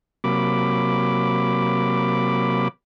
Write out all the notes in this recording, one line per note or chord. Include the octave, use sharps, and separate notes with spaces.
C3 F#3 A#3 B5 D6